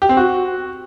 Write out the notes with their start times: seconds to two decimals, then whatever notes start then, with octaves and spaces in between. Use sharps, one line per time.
0.02 G4
0.09 C4
0.17 F#4